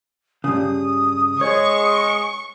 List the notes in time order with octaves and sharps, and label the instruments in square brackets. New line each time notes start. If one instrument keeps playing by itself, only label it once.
[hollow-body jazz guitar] G2 C#3 [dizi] D#6
[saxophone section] G#3 [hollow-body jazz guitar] C#5 [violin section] C#6